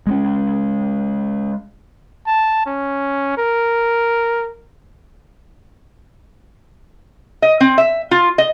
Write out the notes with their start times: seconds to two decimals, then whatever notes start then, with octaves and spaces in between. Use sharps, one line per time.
0.07 G#3 A#3 C#4
2.27 A5
2.66 C#4
3.38 A#4
7.42 D#5
7.61 C4
7.78 E5
8.11 F4
8.38 D#5